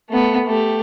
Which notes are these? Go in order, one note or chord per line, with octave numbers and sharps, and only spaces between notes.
A3 B3
A3 G4